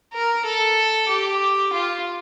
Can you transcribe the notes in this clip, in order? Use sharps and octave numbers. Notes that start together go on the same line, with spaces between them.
A#4
A4
G4
F4